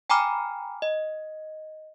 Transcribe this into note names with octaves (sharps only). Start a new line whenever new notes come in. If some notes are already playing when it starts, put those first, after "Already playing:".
G5 G#5 A#5 B5 D6 F6
D#5